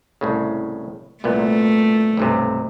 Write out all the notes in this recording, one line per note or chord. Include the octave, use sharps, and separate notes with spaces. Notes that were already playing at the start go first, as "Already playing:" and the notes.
C2 A2 C#3
C2 A#2 A3 B3
B1 G2 C3